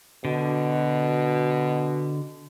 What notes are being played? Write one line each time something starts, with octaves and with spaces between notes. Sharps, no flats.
B2 D3